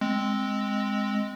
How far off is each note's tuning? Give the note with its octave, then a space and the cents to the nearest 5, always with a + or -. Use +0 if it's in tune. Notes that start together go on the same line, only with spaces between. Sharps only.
G#3 +0 C4 +0